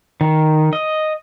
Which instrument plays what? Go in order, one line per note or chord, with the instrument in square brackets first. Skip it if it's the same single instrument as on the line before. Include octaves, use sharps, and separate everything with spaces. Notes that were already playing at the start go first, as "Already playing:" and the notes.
[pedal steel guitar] D#3
D#5